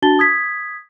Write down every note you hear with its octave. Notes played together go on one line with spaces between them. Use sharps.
D4 F#4 A5 A6 G7
D#6 G#6 B6